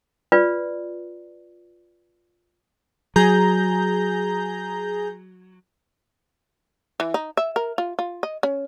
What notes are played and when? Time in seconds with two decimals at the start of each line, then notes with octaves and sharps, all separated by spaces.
0.32 F4 B4 D5
3.16 F#3 G#4 A#5 G6
7.00 E3
7.14 D#4
7.37 E5
7.56 A#4
7.78 F4
7.99 F4
8.23 D#5
8.43 C#4